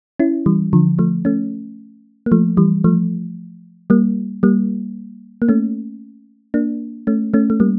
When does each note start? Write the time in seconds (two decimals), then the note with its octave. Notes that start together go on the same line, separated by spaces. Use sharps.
0.19 C#4 E4
0.46 E3 G3
0.73 D3 F3
0.99 F3 A3
1.25 A3 C#4
2.26 A#3
2.32 F3 A3
2.57 E3 G3
2.84 F3 A3
3.90 G3 A#3
4.43 G3 A#3
5.42 A#3
5.49 A3 C#4
6.54 A#3 D4
7.07 A3 C#4
7.34 A3 C#4
7.50 A3
7.60 G3 A#3